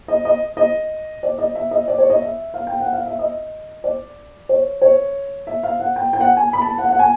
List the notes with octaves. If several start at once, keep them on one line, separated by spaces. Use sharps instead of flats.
D#5
D#5
D#5
D5
D#5
E5
D#5
D5
C#5
D#5
E5
F5
G5
F#5
F5
E5
D#5
D5
C#5
C#5
E5
F5
F#5
G5
G5
F#5
G#5
B5
A5
F#5
F#5
G#5